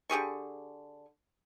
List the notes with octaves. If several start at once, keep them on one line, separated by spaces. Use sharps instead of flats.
D3 G4 G#4 C#6